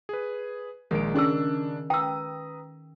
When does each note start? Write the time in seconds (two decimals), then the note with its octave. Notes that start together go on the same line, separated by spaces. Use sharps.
0.09 G#4 B4
0.91 A#1 D#3 G#3 D7
1.15 C#3 C#4 D4 G#4 E6
1.90 B4 G5 A#5 D#6 E6